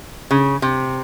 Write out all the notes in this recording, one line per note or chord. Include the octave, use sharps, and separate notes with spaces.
C#3
C3